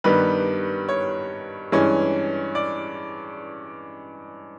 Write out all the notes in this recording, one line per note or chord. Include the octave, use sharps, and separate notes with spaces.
G2 D#3 G3 B3 B4
C#5
G2 E3 G#3 C#4
D5